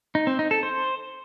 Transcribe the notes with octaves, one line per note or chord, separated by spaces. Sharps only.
D#4
C4
D#4
A4
C5